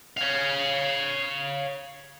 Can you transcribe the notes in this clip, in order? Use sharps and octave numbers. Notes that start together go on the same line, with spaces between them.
C#5 F5